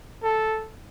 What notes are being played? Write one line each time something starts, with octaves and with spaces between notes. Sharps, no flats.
A4